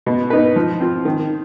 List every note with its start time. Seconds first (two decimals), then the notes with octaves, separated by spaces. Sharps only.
0.06 B2
0.30 B3 D#4 B4
0.56 F3
0.80 C4 F4
1.05 D#3